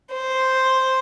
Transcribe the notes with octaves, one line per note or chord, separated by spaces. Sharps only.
C5